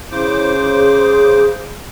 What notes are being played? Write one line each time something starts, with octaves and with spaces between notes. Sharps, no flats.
C#3 E4 C5 D6
G#4